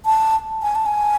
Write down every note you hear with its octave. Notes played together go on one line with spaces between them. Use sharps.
A5
G#5
A5
G#5